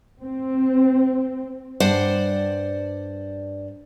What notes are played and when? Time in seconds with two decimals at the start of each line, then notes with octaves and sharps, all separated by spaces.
0.20 C4
1.80 G2 C5 D5 F#5